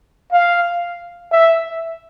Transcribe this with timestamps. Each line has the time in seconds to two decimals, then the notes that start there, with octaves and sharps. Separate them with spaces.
0.32 F5
1.32 E5